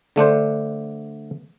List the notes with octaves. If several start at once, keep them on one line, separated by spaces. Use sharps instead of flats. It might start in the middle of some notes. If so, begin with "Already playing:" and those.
D3 A3 D4 C5